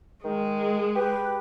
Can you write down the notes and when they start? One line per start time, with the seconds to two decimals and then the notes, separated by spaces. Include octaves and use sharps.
0.24 D#3 G#3
0.95 G4 B4